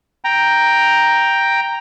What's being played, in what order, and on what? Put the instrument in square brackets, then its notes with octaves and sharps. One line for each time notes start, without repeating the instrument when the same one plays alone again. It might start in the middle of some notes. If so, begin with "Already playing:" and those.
[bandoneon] G5 A#5